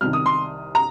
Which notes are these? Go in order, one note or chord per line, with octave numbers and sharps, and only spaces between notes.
C2 C3 D#3 F6
D#6
C6
A#5